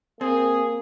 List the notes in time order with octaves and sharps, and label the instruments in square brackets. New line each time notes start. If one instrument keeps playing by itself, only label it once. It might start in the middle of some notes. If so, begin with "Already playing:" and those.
[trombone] A#3 [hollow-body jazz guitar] C4 [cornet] G#4